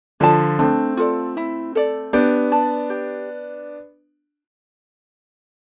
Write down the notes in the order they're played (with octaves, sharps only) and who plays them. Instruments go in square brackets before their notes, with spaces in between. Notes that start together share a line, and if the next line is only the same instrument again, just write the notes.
[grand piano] D3 F3 [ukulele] D5 A5
[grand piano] A3 C4 [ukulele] D4
[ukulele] F4 A4 D5
E4
A4 D5
[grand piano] B3 D4 [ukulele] G4
[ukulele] D5 A5
G4